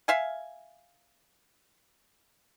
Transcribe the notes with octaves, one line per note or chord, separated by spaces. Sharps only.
E5 F5 G#5